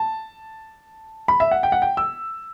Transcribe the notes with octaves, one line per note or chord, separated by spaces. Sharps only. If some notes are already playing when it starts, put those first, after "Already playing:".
Already playing: A5
B5
E5
F#5
G5
F#5
G5
E6